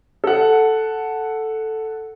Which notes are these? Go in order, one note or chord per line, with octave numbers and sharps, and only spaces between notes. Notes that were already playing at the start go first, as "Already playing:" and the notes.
A4 F#5